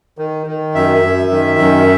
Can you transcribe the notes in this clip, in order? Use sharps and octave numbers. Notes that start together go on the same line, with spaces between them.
D#3
D#3
F#2 E5
F#2
D#3
F#2